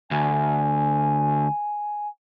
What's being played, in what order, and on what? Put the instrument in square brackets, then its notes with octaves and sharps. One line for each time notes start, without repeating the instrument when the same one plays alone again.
[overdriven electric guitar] D2 [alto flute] G#5